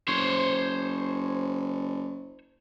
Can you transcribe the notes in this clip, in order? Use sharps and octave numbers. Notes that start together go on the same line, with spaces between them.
F#1 C5 C#5